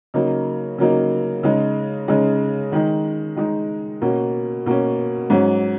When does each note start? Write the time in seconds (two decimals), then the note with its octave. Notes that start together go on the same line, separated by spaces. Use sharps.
0.14 C#3 F#3 A#3 D#4
0.78 C#3 F#3 A#3 D#4
1.43 C#3 G#3 D#4
2.08 C#3 G#3 D#4
2.72 D#3 G#3 D#4
3.36 D#3 G#3 D#4
4.02 B2 A#3 C#4
4.66 B2 A#3 C#4
5.30 G#2 F#3 C#4